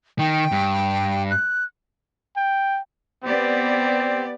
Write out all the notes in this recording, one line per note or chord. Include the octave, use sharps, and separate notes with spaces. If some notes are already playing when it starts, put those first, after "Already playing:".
D#3 G5
G2
F#6
G5
B3 C4 G4 D5